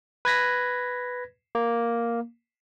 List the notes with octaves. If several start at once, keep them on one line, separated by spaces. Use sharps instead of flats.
B4 G#6 A#6 B6
A#3